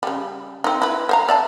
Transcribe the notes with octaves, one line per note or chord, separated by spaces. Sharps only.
C#3 G3
C4 D#4
E4 B4
C5 F5 A#5
D5 E5 A5